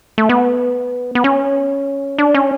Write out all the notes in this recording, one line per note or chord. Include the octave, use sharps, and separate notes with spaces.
A3
B3
B3
C#4
D4
C#4